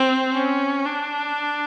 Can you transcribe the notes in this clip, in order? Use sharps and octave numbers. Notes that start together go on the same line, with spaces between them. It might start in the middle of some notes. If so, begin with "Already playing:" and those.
Already playing: C4
C#4
D4